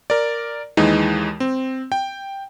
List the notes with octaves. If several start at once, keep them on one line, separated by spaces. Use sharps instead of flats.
A#4 D5
D#2 E3 G#3 D#4
C4
G5